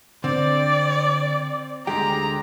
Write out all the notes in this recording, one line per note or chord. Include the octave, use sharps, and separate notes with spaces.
D3 C4 D5
D2 D3 G#3 G4 G5 A#5